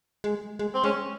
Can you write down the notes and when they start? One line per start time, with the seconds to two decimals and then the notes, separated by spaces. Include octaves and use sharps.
0.24 G#3
0.59 G#3
0.74 C4
0.84 G#3 C#4